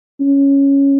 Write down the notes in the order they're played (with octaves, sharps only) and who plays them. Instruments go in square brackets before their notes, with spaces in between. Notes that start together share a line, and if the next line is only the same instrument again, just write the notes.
[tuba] C#4